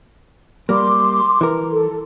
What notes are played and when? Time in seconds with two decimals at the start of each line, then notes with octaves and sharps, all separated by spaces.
0.69 G3 A#3 C6 D6
1.41 E3 A#4
1.71 A4